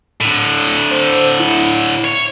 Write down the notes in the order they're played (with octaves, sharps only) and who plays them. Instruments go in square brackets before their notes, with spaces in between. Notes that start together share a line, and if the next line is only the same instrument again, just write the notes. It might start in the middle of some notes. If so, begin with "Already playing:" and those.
[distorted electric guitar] A2 D3
[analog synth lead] C5
E4
[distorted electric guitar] C#5